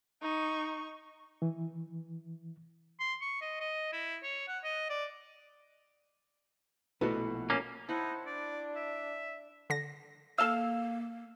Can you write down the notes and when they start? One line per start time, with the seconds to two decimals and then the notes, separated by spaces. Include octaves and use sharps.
0.22 D#4 C#6
1.42 E3
3.00 C6
3.21 C#6
3.41 D#5
3.61 D#5
3.93 E4
4.23 C#5
4.48 F#5
4.64 D#5
4.89 D5
7.01 A#1 B2 A3 E4 F#4 A4 B4
7.50 A#3 C#4
7.89 D#4 E4 C5 F#5 A5
8.26 D4 D5
8.76 E5
9.70 D3 A#6
10.38 A#3 A4 F5 E6 E7